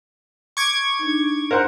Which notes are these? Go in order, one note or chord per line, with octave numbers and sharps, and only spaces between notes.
C#6 D6 G#6
D4 D#4
G#4 A#4 C5 F#5